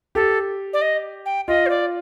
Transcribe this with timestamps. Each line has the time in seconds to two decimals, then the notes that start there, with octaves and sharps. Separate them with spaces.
0.15 G4 A4
0.73 D5
0.82 D#5
1.26 G5
1.48 F4 D#5
1.66 C5
1.70 D5